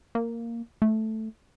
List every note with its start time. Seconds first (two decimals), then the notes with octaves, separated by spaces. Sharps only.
0.15 A#3
0.82 A3